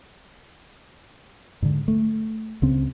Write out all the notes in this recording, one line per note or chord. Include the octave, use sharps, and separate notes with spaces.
G#2 D3
A3
C#2 C#3 C4